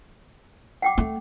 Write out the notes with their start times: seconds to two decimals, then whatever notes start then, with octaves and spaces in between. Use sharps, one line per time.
0.82 F#5 G5 D6
0.98 A3